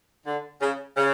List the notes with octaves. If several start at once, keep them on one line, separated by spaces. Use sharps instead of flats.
D3
C#3
C#3